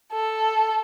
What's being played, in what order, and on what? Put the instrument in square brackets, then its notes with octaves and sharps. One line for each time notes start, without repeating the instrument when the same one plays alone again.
[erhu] A4